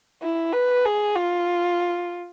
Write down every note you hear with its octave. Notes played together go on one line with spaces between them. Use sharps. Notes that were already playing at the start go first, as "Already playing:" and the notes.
E4
B4
G#4
F4